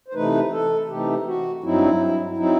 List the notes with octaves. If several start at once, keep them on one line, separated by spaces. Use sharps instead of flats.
C5
C3 E3 A3 D#4 B4
A4
C3 E3 A3 D#4 G4
F#4
G2 F#3 C4 D#4 E4
F#3 C4 D#4 E4